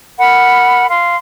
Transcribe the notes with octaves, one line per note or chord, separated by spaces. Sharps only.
A#4 F#5 B5
F5 C6